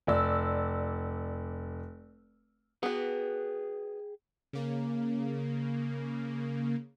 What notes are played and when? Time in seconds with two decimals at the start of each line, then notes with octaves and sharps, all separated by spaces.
0.07 F1 D5 E6
2.83 B3 F#4 G#4 G5
4.53 C#3 A#3